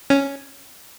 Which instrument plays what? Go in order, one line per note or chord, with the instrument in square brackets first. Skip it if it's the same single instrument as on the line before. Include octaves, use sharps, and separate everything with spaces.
[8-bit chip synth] C#4